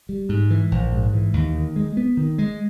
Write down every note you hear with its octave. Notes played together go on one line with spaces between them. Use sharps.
G3
G#2
E3
A#1
G#2
E3
D#2
D#3
G#3
B3
D#3
G#3